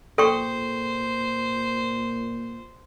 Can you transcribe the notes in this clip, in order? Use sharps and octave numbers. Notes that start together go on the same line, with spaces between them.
A#2 A4 C5 G5 C#6